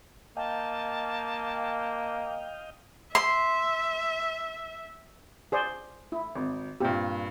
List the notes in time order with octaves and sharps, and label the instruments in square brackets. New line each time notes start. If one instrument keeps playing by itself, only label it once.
[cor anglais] A#3 [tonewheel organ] D#5 F5 G5 [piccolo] A5
[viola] E5 [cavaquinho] C6
[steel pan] G#4 C5 D5
E4
[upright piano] G#1
[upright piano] G2 A#2 [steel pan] C4 G4